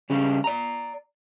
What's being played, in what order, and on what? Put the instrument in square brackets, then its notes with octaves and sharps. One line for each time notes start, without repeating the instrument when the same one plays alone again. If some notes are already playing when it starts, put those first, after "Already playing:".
[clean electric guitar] C#3 G3 C#4 G#4
D5 A#5